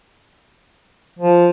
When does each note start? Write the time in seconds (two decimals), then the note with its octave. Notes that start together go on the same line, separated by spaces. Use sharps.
1.19 F3